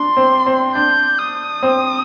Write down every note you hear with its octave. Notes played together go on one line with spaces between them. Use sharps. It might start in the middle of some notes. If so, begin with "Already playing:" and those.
Already playing: D4 C6
C4
C4
D4 G6
D#6
C4